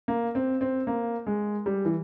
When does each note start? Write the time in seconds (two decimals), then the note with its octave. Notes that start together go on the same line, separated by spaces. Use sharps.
0.08 A#3
0.35 C4
0.61 C4
0.87 A#3
1.27 G#3
1.66 G3
1.85 E3